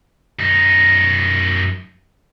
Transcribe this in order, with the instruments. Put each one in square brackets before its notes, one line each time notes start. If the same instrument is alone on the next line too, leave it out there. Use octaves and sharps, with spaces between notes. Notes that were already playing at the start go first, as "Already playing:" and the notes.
[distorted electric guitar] F#2 D#4